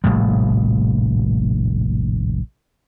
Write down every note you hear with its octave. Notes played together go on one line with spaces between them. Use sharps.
F1 A#1 A2 G3